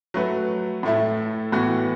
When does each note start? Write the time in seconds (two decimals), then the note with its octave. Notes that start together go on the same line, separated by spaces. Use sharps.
0.14 F#3 A3 F#4 B4
0.83 A2 A3 E4
1.52 A2 E3 B3 F#4